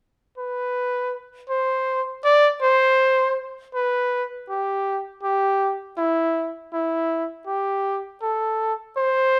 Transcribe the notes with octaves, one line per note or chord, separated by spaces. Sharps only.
B4
C5
D5
C5
B4
G4
G4
E4
E4
G4
A4
C5